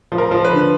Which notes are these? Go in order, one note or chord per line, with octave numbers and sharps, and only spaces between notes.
F3
A#4
F3
B4
D3